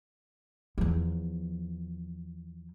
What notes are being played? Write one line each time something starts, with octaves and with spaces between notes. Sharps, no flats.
E2 F3